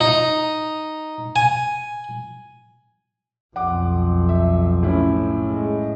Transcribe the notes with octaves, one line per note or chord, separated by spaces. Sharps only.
D#4
G#5
B1 F2 F#5 D6
E5
A2 C#4 E4
G#3